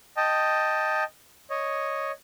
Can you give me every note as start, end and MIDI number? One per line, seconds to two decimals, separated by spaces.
0.17 1.04 75
0.17 1.04 79
0.17 1.04 81
1.50 2.11 73
1.50 2.11 75